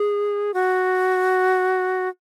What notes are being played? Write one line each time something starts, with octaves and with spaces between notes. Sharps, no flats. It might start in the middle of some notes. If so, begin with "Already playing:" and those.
Already playing: G#4
F#4